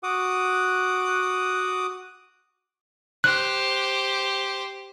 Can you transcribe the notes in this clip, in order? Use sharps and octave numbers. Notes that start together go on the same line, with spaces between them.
F#4 F#5 D6 D#6
G4 C5 F#6